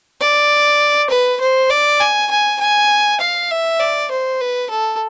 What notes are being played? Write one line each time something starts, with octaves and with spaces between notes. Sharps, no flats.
D5
B4
C5
D5
G#5
G#5
G#5
F5
E5
D5
C5
B4
A4